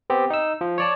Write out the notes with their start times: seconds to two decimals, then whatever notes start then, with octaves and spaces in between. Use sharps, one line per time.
0.10 B3 C4 G4
0.30 D#4 E6
0.61 F3
0.78 C#5 D5 A5